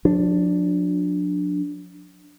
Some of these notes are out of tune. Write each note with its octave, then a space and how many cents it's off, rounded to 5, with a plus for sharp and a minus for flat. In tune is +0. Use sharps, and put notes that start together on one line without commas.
F3 +45 D4 +0